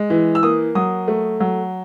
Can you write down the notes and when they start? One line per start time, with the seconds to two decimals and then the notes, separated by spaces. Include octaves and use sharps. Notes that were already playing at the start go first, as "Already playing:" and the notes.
Already playing: G#3
0.10 E3
0.35 E6
0.43 A#3 D#6
0.75 F#3 D#6
1.08 A3
1.40 F#3